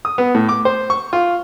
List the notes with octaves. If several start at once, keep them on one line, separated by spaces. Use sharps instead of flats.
D#6
B3
A2
D6
C5
C#6
F4